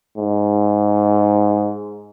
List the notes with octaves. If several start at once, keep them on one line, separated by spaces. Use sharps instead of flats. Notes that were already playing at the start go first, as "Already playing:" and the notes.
G#2